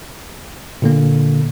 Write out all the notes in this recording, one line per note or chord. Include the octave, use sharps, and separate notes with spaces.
A#2 D3 A#3